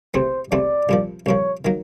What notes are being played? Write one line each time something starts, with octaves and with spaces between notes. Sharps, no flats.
E2 C3 E3 A3 C4 C5
E2 C3 E3 A3 C4 D5
C2 A#2 F3
C2 A#2 F3 C#5
D#3 F#3 A#3